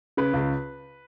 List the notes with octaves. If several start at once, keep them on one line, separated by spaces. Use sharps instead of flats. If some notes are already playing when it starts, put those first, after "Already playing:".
C#3 B4
C#2